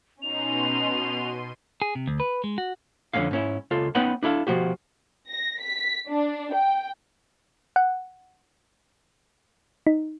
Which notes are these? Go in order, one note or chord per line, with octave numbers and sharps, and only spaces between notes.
B2 C#4 D#4 C6 D#7 F7
G#4
C3
D2
B4
G#3
F#4
F2 A#2 D3 C#4 F5
G#2 C#4 E4
C#2 F4 A4
B3 C#4 D#4 B4 F#5 G5
D4 E4 A4 F5
B2 F3 F#4 G4
A#6
B6
D4
G5
F#5
D#4